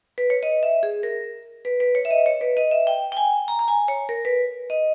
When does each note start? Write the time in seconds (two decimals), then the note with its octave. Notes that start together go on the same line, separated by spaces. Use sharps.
0.18 B4
0.30 C#5
0.43 D#5
0.63 E5
0.83 G#4
1.03 A#4
1.65 B4
1.80 B4
1.95 C#5
2.05 E5
2.11 D#5
2.26 C#5
2.41 B4
2.57 D#5
2.71 E5
2.87 G5
3.12 G5
3.17 G#5
3.48 A#5
3.59 A#5
3.68 G#5
3.88 C#5
4.09 A#4
4.25 B4
4.70 D#5